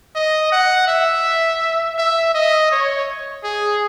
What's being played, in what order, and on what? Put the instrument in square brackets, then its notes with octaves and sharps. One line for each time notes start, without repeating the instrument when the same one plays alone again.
[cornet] D#5
F#5
E5
E5
D#5
C#5
G#4